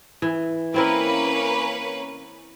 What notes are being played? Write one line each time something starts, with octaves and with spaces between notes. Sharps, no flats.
E3
A#3 C4 C#4 E4 A#4 B4